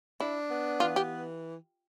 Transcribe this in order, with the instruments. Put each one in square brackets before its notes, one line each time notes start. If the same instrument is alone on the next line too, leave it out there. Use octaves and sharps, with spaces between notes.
[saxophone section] D4 [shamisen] E4
[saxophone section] B3
[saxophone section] E3 [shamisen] F4
[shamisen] G4